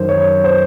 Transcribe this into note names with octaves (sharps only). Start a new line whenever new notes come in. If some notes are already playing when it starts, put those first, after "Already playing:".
Already playing: F#2 D#3 C5
C#5
C5